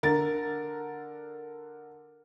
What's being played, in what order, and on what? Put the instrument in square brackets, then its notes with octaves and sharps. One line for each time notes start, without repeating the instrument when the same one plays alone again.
[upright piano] D3 A#4 A6